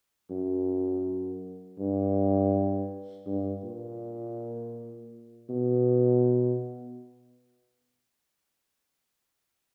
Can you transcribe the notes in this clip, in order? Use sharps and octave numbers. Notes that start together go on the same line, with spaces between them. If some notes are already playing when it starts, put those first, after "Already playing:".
F#2
G2
G2
A#2
B2